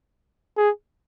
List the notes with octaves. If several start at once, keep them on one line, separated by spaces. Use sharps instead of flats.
G#4